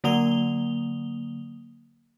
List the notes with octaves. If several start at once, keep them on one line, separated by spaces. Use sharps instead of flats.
D3 F#3 A#3 D#6 F7 G7